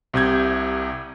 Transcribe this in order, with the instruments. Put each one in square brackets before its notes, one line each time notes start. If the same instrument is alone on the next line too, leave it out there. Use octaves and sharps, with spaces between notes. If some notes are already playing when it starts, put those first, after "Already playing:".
[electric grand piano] C2 C3 G6 G#6